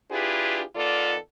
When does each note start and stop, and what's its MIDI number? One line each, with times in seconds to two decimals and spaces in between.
0.11 0.62 62
0.11 0.62 64
0.11 0.62 65
0.11 0.62 67
0.11 0.62 68
0.11 0.62 71
0.76 1.15 51
0.76 1.15 59
0.76 1.15 65
0.76 1.15 69
0.76 1.15 74